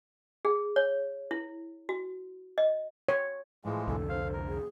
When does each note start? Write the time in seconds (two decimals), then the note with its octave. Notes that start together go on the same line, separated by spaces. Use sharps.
0.45 G#4
0.76 C#5
1.31 E4
1.89 F#4
2.58 D#5
3.08 C#5
3.65 A2 E3 F3 G#3 G#4
3.88 C2 F2 D3 A4
4.09 C5 F5
4.33 A#4
4.47 G#4